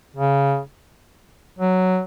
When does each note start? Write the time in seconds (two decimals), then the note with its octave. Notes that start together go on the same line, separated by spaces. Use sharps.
0.17 C#3
1.59 F#3